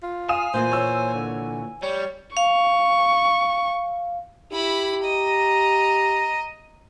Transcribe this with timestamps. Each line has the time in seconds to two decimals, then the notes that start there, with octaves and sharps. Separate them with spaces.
0.03 F4
0.29 F5 G#5 D#6 E7
0.54 A#2 E3 A#3 C5
0.71 C#5 E6
1.14 D3
1.82 G3 C#5
2.37 F5 C#6
4.52 E4 G4 B5
5.04 D#5 A#5